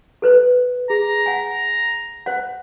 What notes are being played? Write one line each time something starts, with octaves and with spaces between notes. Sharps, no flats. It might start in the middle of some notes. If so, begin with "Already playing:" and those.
A4 B4 C5
G#4 A#5
F#5 G#5
C5 F#5